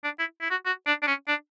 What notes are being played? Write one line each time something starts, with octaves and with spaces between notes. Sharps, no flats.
D4
E4
E4
F#4
F#4
D4
D4
C#4
D4